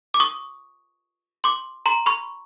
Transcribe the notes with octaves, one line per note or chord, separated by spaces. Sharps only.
D6
C#6 D#6
C6 D6
A#5 C6
B5 C#6